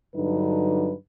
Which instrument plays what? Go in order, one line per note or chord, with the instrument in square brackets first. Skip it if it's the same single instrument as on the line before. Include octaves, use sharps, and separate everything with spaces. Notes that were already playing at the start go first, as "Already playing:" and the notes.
[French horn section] G2 D3 F#3 D4 D#4 B4